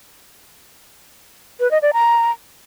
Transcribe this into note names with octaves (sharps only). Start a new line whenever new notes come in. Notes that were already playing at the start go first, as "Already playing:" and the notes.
B4
D#5
D5
A#5